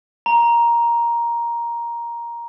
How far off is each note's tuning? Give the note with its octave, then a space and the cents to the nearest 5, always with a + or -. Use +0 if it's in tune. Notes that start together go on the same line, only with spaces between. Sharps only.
A#5 +10